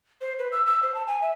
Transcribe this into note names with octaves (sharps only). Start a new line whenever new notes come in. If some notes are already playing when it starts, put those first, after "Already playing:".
C5
B4
E6
E6
C5
A5
G#5
E5